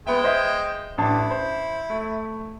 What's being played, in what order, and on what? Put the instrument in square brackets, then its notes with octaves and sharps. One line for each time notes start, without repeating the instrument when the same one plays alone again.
[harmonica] G#3 G5 [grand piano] B3 E5
[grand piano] C5 D#5 E5
[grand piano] A1 D4 A5 [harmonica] E4
[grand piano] C5
A3